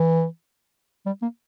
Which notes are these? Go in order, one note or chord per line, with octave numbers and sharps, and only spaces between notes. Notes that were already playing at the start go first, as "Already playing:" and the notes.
Already playing: E3
G3
A#3